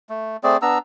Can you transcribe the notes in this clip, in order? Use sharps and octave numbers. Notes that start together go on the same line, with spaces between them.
A3
A3 C4 G#4 D5
B3 D4 A#5 E6